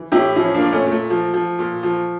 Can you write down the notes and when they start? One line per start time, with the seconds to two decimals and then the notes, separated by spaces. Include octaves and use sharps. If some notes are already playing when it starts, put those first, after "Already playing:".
Already playing: E3
0.12 A2 E4 G4
0.36 F3 C#4 E4
0.55 A#3 D4
0.61 A#2
0.72 A3 C#4
0.86 A#2
0.92 A3
1.10 F3
1.34 F3
1.59 A#2
1.83 F3